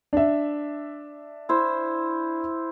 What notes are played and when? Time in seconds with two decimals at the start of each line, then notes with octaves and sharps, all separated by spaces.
0.13 D4 E5
1.49 E4 C5